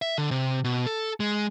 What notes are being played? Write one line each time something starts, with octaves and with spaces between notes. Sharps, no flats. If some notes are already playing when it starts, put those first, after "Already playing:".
E5
D3
C3
B2
A4
G#3